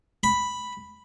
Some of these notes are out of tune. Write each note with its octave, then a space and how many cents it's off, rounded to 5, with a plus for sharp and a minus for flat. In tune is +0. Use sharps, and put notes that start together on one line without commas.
B5 +0